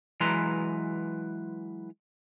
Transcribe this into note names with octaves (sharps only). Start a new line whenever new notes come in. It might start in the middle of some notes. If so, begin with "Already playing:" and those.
E3 F#3 G#3 B4 A#5 C6